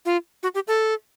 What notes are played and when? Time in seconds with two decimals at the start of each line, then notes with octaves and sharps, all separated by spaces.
0.05 F4
0.43 F#4
0.54 G4
0.67 A4